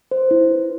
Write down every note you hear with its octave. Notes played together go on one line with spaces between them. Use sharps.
C5
E4
B4